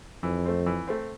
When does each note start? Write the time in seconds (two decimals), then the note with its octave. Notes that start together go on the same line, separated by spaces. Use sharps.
0.23 F2 E3
0.45 A3 C4
0.66 E3
0.87 A3 C4